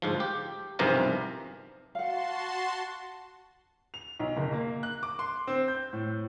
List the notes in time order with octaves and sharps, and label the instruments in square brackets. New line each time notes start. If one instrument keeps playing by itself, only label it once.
[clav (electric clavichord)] D2 G#2 F3
G4
B1 E2 G2 C3 F3 A#4
[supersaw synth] F#4 A5 C6 [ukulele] F5 F#5
[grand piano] F7
B1
F#1
A#3
F#6
D6
C6
C4
G6
A2